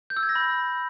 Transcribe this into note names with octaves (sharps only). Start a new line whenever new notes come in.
G6
E6
G#6
A#6
B5